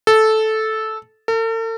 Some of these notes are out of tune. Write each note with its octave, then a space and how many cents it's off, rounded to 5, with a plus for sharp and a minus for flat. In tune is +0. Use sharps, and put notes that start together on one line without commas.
A4 -10
A4 +45